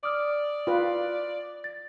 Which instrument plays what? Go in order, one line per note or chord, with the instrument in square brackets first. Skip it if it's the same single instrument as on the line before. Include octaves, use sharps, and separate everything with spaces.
[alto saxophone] D5 [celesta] D6 D#6 F6
[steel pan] F4 B4
[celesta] A6